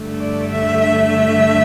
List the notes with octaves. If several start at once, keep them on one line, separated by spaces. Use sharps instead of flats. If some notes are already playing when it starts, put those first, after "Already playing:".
Already playing: G2 D3 A3
D5
E5
E5